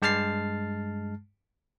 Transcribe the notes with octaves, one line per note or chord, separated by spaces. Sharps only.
G2 G#3 A5 F6 A6 C7